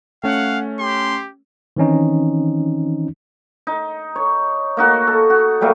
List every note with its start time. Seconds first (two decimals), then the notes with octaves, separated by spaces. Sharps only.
0.24 A3 C#4 F5 F#5
0.80 G4 C6
1.77 D#3 E3 C4 C#4 D#4
3.67 D#4
4.16 C#5
4.77 A#3 D#4 F#4
5.07 A4
5.30 F#4
5.61 F#3 G3 A3 A#3